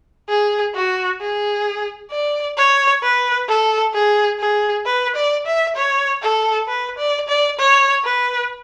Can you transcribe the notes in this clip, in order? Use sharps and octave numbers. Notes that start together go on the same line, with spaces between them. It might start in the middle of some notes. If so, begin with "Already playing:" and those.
G#4
F#4
G#4
D5
C#5
B4
A4
G#4
G#4
B4
D5
E5
C#5
A4
B4
D5
D5
C#5
B4